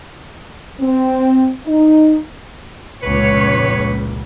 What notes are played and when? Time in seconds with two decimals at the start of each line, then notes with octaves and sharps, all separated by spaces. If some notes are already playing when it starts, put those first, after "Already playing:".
0.80 C4
1.66 D#4
3.03 F1 C#2 A#2 B4 C#5